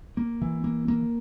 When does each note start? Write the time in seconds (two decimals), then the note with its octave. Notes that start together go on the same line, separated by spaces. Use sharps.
0.17 A#3
0.42 E3
0.64 A#3
0.88 A#3